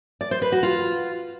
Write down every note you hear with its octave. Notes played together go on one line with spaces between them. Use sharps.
D5
C5
B4
F#4
F4